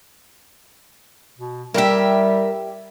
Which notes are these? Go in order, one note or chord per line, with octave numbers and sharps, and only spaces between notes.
B2
G3 E4 F#4 G4 A#4 E5